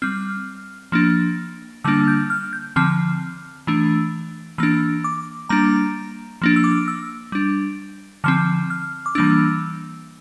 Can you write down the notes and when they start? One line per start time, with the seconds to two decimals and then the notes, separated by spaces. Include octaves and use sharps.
0.02 G3 C4 F6
0.92 F3 A#3 D4
1.84 D3 G3 A#3 D4 E6
2.08 G6
2.30 F6
2.53 G6
2.76 D3 F3 C4 F6
3.67 E3 A3 D4
4.58 E3 A#3 D4 E6
5.04 D6
5.49 G3 A#3 D4 A#5
6.42 F3 A#3 D4
6.56 E6
6.64 D6
6.88 E6
7.32 G3 D4
8.24 D3 F3 C4 F6
8.70 F6
9.06 D6
9.15 E3 G3 A#3 D4 E6